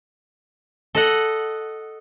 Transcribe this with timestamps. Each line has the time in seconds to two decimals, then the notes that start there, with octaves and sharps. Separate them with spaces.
0.95 A4 D#5 F#5